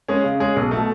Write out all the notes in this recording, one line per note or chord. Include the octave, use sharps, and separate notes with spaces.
G#3 C#4 G#4
C#3
G#3 C#4 G#4
B1
B2 A3